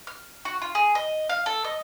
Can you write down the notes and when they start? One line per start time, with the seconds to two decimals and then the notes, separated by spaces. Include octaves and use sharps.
0.07 F6
0.45 F#4
0.62 F4
0.75 G#4
0.95 D#5
1.29 F5
1.46 A4
1.64 D#5